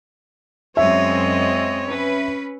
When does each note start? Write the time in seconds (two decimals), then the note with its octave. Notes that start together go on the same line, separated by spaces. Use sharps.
0.77 F#2 G#3 C4 C#5 D#5 E5
1.86 C#4 B4